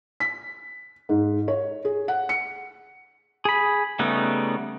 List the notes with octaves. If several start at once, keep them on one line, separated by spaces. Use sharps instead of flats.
B6
G#2
C#5
G#4
F#5
C#7
G#4 B5
C#3 G3 A3 B3 D#4